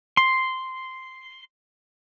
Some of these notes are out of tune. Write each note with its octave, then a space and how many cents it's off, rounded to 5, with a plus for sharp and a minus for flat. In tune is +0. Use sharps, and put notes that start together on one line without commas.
C6 -5